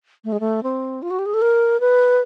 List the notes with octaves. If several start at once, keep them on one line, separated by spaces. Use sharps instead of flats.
A3
G#3
A3
C4
F4
F#4
G4
G#4
A4
A#4
B4